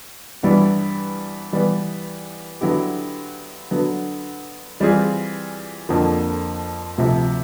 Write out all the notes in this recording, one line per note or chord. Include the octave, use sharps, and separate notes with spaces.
G2 E3 G3 B3 E4
E3 G3 B3
D3 F#3 B3 E4 G4
D3 F#3 B3
E3 G3 C4 F4 G#4
F2 D3 F3 A#3
D2 C3 F3